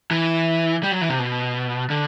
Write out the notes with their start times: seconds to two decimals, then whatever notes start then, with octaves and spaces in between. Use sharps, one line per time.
0.11 E3
0.83 G3
0.92 F#3
1.01 E3
1.09 C3
1.19 B2
1.90 D3